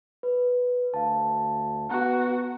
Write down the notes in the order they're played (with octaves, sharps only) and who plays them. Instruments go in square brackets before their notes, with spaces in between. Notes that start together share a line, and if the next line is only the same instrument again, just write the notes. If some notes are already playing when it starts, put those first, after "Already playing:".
[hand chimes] B4
[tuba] D2 [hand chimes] F5 A5
[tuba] B3 [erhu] F#4 [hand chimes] A#5 F#6